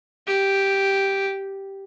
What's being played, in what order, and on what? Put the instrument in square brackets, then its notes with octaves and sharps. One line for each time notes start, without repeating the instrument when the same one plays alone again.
[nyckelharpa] G4